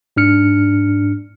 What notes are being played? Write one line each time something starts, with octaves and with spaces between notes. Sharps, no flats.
G#2 D4 F6 C#7